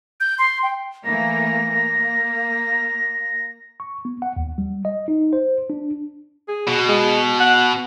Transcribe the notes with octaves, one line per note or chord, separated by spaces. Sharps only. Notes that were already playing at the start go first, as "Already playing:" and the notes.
G6
C6
G5
E3 A3 A#3 A#6
A#3
C#6
B3
F#5
D#2
G3
D#5
D#4
C5
D4
G#4
B2
G#3
F#5